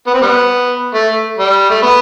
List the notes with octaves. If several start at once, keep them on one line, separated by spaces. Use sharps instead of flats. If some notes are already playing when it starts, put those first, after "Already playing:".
B3
C4
G3 B3
A3
G3
A3
B3